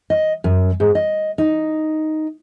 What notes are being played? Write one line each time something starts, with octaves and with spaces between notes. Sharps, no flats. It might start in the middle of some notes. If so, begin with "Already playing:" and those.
D#5
F#2
G#2
D#5
D#4